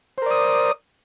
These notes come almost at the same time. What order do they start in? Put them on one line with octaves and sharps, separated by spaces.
C5 A#4 D5 D#6